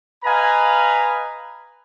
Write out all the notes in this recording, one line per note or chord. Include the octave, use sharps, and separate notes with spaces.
B4 D#5 F5 G#5 A#5 B5